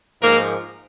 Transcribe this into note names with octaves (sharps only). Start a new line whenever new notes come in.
G#2 F3 A#3 A#4